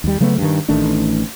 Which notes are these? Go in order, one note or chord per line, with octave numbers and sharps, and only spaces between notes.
D#2 G3
C#3 F#3 A3 B3
G2 D#3
A1 D#3 A3 D4